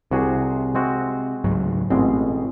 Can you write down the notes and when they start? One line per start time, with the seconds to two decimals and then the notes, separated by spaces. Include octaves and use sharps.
0.11 C2 C3 F#4 G#4
0.75 G#3 C4 F#4
1.44 C#2 G#2 F#3
1.90 A1 B2 G#3 C4